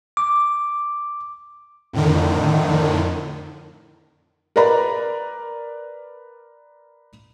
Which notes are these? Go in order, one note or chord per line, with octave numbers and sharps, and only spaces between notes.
D6
F2 A2 D3 D#3
A#4 B4 D5 A#5 B5